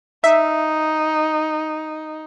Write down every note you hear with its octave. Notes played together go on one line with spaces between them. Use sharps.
D#4 E5